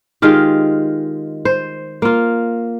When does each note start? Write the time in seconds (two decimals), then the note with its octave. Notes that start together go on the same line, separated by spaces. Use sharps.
0.22 D#3 G#3 F4 G4
1.45 C5
2.02 A#3 F4